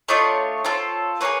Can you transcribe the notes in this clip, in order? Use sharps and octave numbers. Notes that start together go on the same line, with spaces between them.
A3 D4 F4 C#5 D#5
C4 F4 A4
A#3 D#4 G#4 B4 C#5